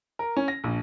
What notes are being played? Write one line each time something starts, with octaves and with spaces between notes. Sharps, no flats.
A#4
C#4
A#6
A#1